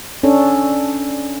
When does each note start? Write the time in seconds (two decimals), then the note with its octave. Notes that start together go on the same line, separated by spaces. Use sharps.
0.23 C#4 D4 A4